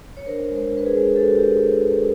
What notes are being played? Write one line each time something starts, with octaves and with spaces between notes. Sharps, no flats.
C#5
D4 A#4 C5
G#3
A#4 C5
D4
B4
G#4 A#4
G#3
G#3 G4 A4
F#4
D4 G4